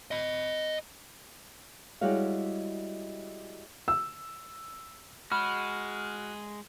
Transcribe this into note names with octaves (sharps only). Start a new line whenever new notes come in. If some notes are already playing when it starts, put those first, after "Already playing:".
D#5 B5
G3 G#3 E4 F#4 C#5 F5
E6
G#3 F#4 B5 F6